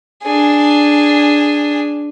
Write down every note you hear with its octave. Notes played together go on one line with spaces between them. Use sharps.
D4 G#4